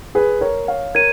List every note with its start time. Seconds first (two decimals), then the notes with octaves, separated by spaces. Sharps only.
0.15 G#4 B4
0.41 A#4 C#5
0.68 C#5 F5
0.95 A#4 C#5 G#6 D#7